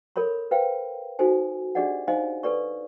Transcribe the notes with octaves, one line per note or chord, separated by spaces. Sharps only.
A4 A#4 C#5 B5 C6
B4 C5 F5 G5
D#4 F#4 A4 C5 G#5
D4 G4 G#4 D5 D#5 F#5
D#4 C5 D#5 F5 G#5 C6
A4 B4 D5 C#6